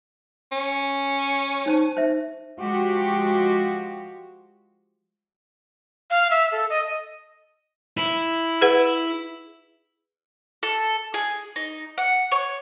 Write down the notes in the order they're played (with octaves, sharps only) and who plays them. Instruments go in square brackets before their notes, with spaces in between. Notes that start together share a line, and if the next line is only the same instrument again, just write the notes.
[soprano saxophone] C#4
[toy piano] D#4 C5 A5
C5 E5
[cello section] F3 G#3 F#4 G4
[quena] F5
E5
A4
D#5
[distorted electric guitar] E4
[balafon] G#4 B4 F#5
[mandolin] A4
G#4
D#4
F#5
C#5